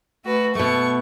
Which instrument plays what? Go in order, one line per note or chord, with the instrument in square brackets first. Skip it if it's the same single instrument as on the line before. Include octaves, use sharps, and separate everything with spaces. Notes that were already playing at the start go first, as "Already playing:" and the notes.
[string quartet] A3 F#4 B4
[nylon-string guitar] B2 A3 [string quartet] C#6